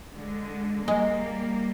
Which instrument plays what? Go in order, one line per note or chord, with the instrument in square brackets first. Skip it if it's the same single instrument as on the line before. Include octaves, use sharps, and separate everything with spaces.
[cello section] D3 G#3
[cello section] G3 A#3 [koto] G#3